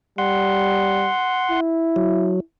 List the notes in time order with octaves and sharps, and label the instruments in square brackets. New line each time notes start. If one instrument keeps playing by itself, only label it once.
[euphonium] G3 [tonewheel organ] F#5 C6
[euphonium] E4
[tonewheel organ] F#3